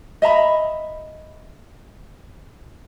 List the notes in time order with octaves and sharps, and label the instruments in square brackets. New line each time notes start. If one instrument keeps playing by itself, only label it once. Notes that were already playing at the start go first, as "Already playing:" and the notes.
[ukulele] D#5 E5 A#5 B5